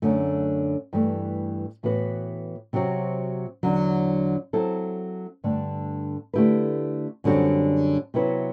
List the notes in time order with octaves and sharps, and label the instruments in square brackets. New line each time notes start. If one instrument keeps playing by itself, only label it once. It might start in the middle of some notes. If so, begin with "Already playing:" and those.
[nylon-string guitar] F#2 D3 A3
G2 E3 A3
A2 E3 B3 F#4 B4
C3 F#3 C4 F#4
E2 D3 F#3
F#3 C4 E4 A4
G2 D3 A3 D4
D3 A3 E4 G4 B4
F#2 D3 G3 C4 F#4
C3 F#3 B3 E4 B4